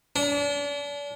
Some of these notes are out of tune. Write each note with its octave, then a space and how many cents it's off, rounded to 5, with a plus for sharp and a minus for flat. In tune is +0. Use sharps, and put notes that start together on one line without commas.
D4 -40